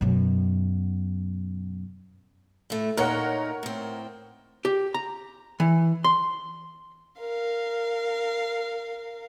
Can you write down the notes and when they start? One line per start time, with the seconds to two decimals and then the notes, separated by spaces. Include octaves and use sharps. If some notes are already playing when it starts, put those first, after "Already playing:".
0.01 F#2 B2
2.70 A2 A3
2.97 A#2 D#4 A#4 C#5 F#5
3.63 A2 C4
4.65 G4
4.94 A#5
5.60 E3
6.04 C6
7.20 A#4 F5